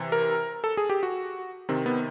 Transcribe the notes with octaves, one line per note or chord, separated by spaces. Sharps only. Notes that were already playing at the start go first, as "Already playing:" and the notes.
Already playing: C3 E3
A#4
A4
G#4
G4
F#4
C3 D#3 C4
B3